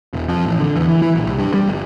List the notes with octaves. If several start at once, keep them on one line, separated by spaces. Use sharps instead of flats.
E1
F2
A1
D3
E2
E3
E3
A#1
C2
G2
G3
G1